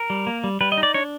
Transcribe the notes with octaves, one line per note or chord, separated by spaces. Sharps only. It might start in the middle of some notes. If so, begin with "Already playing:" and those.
Already playing: A#4
G3
A#3
G3
G3 B4
D#5
D#4
D5
D4 C#5